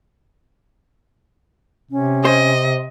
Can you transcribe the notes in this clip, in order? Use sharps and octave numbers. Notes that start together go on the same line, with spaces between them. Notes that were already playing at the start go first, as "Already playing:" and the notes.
C3 C#4
C5 D#5